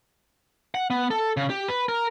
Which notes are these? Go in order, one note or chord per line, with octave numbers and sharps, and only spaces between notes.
F#5
B3
A4
C#3
G4
B4
A#4